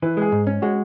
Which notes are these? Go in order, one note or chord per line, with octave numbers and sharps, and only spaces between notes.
E3 B4
G#3 G#4
G#2
C#4
G#3 F#4